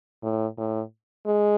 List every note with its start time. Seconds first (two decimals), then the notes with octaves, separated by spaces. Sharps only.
0.23 A2
0.58 A2
1.26 G#3